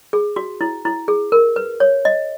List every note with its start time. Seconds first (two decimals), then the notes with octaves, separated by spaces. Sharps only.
0.13 G#4
0.36 F#4
0.61 E4
0.85 E4
1.08 G#4
1.32 A#4
1.56 B4
1.80 C#5
2.05 D#5